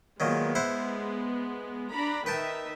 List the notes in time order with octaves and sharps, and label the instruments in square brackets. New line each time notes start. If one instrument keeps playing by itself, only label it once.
[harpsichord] A#2 D#3 F#3 [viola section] G#3 B3
[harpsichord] E4 C5 F#5
[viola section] D4 A#5 B5
[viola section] D#3 D#4 E5 [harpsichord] B4 G5 A5